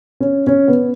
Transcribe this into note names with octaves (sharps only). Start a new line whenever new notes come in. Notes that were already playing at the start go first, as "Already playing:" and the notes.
C#4
C#4
B3